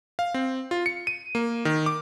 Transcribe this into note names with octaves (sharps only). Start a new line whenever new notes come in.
F5
C4
F4
C#7
D#7
A#3
D#3
D6